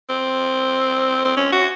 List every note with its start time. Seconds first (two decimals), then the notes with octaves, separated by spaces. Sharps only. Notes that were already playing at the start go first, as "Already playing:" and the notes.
0.10 C4
1.25 C4
1.37 C#4
1.53 F#4